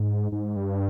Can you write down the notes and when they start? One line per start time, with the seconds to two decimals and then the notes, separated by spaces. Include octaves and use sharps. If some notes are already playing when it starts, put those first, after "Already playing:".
Already playing: G#2
0.32 G#2
0.56 G2